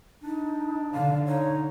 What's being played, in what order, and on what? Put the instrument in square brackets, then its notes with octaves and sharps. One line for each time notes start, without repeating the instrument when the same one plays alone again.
[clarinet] D4 [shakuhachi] D#4
[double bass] D3 [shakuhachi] F5
[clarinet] D#4 [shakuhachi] C#5